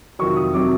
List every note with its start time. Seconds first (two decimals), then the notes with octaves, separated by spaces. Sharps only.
0.19 F2 C3 D#3 F#3 C#6
0.36 D#6
0.54 C3 D#3 F#3 D6